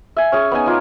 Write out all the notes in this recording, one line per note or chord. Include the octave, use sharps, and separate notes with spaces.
E5 G#5
C#4 G#4 C#5
B3 D#4 G#5
D#4 F4 A#5 D6